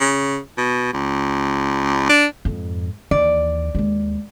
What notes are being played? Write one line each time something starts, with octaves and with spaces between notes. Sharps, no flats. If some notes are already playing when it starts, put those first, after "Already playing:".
C#3
B2
C#2
D4
F2 G#2
D#2 E3 D5
D#2 G#3